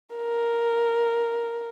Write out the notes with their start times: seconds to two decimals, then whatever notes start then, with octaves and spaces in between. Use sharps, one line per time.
0.15 A#4